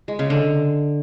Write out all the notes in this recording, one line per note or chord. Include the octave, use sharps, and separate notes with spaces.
G#3
C#3
D3